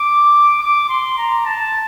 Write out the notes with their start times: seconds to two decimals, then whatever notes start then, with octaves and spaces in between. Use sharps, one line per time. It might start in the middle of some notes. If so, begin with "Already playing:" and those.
Already playing: D6
0.59 D6
0.89 C6
1.17 A#5
1.46 A5